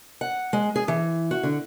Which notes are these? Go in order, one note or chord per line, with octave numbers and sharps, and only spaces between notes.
F#5
G#3
G#4
E3
F#4
D3